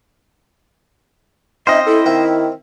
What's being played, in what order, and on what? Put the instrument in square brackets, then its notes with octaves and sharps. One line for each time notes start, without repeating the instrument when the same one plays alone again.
[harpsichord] C4 C#4 F4 [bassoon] D#4 [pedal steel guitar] C5 D#5 [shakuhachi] E5
[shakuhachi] E4 [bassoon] A4
[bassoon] D#3 [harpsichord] C4 F4 E5